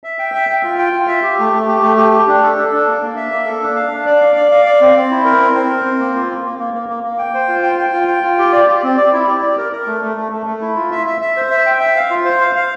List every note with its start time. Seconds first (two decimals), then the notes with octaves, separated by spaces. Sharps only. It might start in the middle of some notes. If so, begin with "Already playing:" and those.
0.04 E5
0.19 G5
0.34 E5
0.49 G5
0.64 F4
0.78 G5
0.93 F4
1.08 E5
1.23 G4
1.39 A3
1.53 A3
1.68 G4
1.82 A3
1.97 G4
2.12 G4
2.27 D4
2.43 A4
2.58 A4
2.72 D4
2.87 A#3
3.01 A#3
3.16 E5
3.31 A#3
3.46 A4
3.62 D4
3.76 F5
3.92 D4
4.06 D5
4.21 F5
4.36 D5
4.51 F5
4.66 D5
4.81 C4
4.96 C4
5.11 E4
5.25 A#4
5.40 C4
5.55 C4
5.70 A#4
5.85 C4
6.00 A#3
6.15 F4
6.29 A#3
6.45 A#3
6.59 A#3
6.74 A#3
6.89 A#3
7.04 A#3
7.18 G5
7.34 C5
7.49 F4
7.63 G5
7.79 G5
7.93 F4
8.08 G5
8.23 F4
8.39 G4
8.53 D5
8.68 G4
8.83 C4
8.97 D5
9.13 E4
9.27 G4
9.42 D5
9.58 A#4
9.72 A#4
9.86 A3
10.02 A3
10.17 A3
10.32 A3
10.46 A3
10.61 E4
10.76 F4
10.91 E5
11.07 E5
11.21 E5
11.36 C5
11.51 E5
11.66 G5
11.80 E5
11.96 F5
12.10 F4
12.25 C5
12.40 F5
12.56 F5